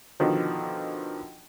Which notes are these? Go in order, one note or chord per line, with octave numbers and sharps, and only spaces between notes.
B2 D3 D#3 F3